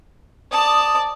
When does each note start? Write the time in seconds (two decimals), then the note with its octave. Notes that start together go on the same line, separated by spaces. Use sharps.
0.51 D5 A5 D#6